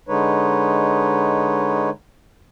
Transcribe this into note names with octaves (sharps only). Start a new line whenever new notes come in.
D3 G#3 D#4 B4 C#5